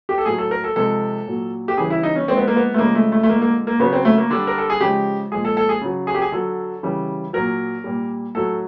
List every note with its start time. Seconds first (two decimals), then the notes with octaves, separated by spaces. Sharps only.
0.09 G4
0.18 A4
0.25 A2 F#3 G#4
0.38 A4
0.51 A#4
0.64 A4
0.76 C3 F3 G#3 A4
1.27 A#2 F#3
1.68 G4
1.77 C#3 E3 G3 G#4
1.90 E4
2.03 D#4
2.15 C#4
2.28 D3 F3 G#3 C4
2.37 B3
2.48 A#3
2.56 B3
2.74 A3
2.78 C#3 F3 G#3 A#3
2.95 A3
3.12 A3
3.23 A3
3.29 D3 F3 G#3 A#3
3.42 A#3
3.67 A#3
3.80 C#3 F#3 B3
3.93 C4
4.05 A3
4.18 A#3
4.30 D3 G3 D4
4.47 A#4
4.58 A4
4.70 G#4
4.81 C#3 F3 G#3 G4
5.32 A#2 F3 G#3 G#4
5.45 A4
5.57 A4
5.69 G#4
5.81 C#3 F#3
6.07 G#4
6.14 G4
6.22 G#4
6.32 D3 F#3 A4
6.83 C#3 E3 G3
7.33 A#2 F#3 A#4
7.84 A#2 G3
8.35 A2 F#3 A4